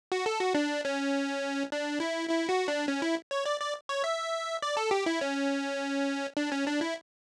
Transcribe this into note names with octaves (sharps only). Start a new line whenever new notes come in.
F#4
A4
F#4
D4
C#4
D4
E4
E4
F#4
D4
C#4
E4
C#5
D5
D5
C#5
E5
D5
A4
G4
E4
C#4
D4
C#4
D4
E4